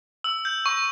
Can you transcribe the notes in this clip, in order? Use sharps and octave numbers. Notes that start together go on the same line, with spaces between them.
E6
G6
C#6